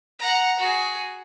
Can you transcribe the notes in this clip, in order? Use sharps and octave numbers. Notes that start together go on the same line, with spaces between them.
F#5 A#5
F#4 G#4